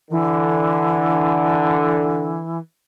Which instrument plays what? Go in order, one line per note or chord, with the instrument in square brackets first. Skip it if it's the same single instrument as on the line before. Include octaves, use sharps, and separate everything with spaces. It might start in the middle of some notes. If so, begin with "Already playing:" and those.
[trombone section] D3 [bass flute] E3